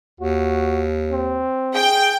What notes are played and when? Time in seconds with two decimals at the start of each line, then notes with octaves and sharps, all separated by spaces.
0.20 D#2 F#4
1.11 C4
1.74 G#4 G5